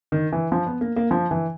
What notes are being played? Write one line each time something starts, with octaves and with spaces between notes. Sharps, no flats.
D#3
E3
F3
B3
A#3
A#3
F3
E3